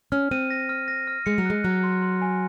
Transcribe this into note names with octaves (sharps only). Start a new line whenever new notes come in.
C#4 F6
C4 D#7
A#6
F6
A#6
F6
G#3 C#7
F#3
G#3 F#6
F#3 F#6
C6
C6
G#5